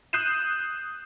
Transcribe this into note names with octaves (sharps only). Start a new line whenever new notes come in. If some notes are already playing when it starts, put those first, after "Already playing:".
D#6 F#6 G6 C7 D#7 E7